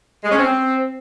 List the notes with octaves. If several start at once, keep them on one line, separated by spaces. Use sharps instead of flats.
G#3
C#4
C4